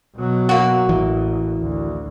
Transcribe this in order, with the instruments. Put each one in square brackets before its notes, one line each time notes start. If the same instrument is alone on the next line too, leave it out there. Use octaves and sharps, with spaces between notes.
[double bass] B2 F#3
[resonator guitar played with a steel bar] A#3 F#4
[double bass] A1 [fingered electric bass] E3
[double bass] D2